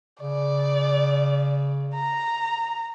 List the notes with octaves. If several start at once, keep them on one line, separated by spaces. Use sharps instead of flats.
C#3 D5
A#5